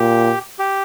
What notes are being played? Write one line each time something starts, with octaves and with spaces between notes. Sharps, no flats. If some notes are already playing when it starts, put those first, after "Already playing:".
Already playing: A#2 G4
G4